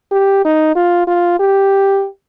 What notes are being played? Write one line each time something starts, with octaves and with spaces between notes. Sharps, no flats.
G4
D#4
F4
F4
G4